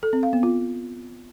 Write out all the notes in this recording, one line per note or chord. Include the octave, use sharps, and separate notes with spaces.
A4
C4
F5
B3
F4